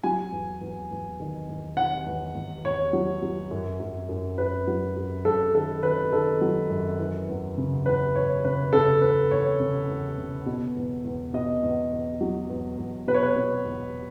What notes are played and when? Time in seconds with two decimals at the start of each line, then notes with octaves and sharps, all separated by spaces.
0.04 F#3 G#5
0.32 E2
0.61 E2
0.91 E2
1.20 D#3
1.49 E2
1.77 D#3 F#5
2.06 E2
2.35 E2
2.64 E2 C#5
2.93 F#3
3.22 F#3
3.51 F#2
3.80 F#2
4.09 F#2
4.38 F#2 B4
4.67 F#3
4.97 F#2
5.25 F#2 A4
5.54 D#3 A4
5.83 D#3 B4
6.12 D#3 A4
6.41 F#3
6.70 F#2
6.99 E3
7.29 E2
7.58 C#3
7.86 E2 B4
8.14 E2 C#5
8.44 C#3 B4
8.73 C#3 A4
9.01 E2 B4
9.31 E2 C#5
9.60 C#3
9.89 E2
10.18 C#3
10.46 B2
10.76 E2
11.04 E2
11.33 B2 D#5
11.63 E2
11.92 E2
12.21 F#3
12.49 E2
12.78 E2
13.07 B2 B4
13.14 C#5
13.23 B4
13.36 B2
13.65 E2